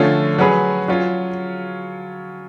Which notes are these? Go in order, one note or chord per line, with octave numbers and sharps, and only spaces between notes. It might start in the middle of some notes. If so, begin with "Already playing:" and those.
Already playing: D3 F3 A3 C#4 F4
F#3 C#4 G#4 B4
F#3 C#4 F4